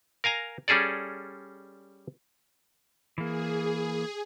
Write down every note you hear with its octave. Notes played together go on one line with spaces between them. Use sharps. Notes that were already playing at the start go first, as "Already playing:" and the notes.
A#4 F5 G#5 A#5
G3 C#4 G#4 A4 D5
E3 A#3 G#4